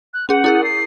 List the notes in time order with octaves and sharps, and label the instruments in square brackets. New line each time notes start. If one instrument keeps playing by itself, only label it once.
[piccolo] F#6
[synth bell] C#4 G#4 [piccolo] F#5
[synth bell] E4 G#4 A#4
[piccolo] C7